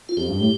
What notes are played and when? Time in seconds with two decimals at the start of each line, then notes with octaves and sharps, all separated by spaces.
0.09 F4
0.17 F2 G4
0.29 G2
0.40 A2